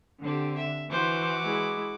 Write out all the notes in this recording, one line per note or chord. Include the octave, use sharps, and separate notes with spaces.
D3 C4 G4
E5
E3 F#4 C5 D6
G#3 E4